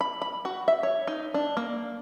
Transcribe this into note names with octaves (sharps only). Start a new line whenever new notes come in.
B5
B5
F#4
E5
C#5
D#4
D4
A#3